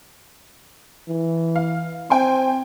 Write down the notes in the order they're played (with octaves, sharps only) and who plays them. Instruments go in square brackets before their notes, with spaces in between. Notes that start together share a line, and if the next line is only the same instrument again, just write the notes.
[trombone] E3
[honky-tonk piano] F5
[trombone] C4 [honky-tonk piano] G5 G#5 C6